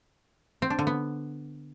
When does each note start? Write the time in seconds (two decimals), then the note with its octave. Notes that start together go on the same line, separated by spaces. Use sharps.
0.62 C4
0.70 D4
0.79 D3
0.87 B3